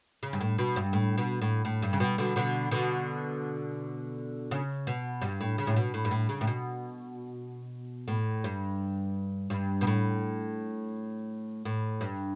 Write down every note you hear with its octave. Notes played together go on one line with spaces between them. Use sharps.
C#3
G2
A2
B2
G2
A2
B2
A2
A2
G2
C#3
B2
B2 D3
B2 D3
B2 D3
C#3
B2
G2
A2
C#3
A2
B2
A2
G2
A2
C#3
A2
B2
A2
G2
G2
B2
A2
A2
G2